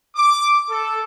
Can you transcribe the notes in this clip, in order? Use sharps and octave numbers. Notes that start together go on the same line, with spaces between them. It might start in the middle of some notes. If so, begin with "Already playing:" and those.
D6
A4